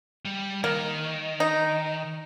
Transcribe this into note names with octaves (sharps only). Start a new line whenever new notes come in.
G3
D#3 A#3
D#4